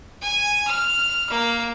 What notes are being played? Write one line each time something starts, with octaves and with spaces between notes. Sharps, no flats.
G#5
F6
A#3